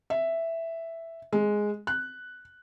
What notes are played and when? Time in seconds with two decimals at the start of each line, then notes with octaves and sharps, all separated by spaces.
0.10 E5
1.33 G#3
1.87 F#6